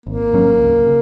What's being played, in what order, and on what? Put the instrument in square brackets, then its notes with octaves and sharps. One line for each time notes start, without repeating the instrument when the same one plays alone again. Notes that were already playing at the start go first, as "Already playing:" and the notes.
[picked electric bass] G#1 [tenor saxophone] A#3
[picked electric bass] G#2 F#3 C#4
C#2
C#3